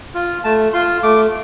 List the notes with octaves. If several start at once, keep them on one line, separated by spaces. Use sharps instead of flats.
F4
A3 A5
F4 C6
A3 D6